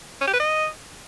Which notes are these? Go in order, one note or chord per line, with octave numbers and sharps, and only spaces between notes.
C#4
G4
B4
D#5